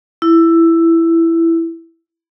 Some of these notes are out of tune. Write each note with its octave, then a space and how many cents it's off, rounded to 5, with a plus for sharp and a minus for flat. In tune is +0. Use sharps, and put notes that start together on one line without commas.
E4 +10